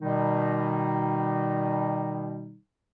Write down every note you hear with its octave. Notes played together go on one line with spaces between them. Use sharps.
B2 D#3 G3 D#4